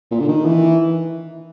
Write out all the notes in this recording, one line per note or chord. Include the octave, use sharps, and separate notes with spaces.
A#2
D3
D#3
E3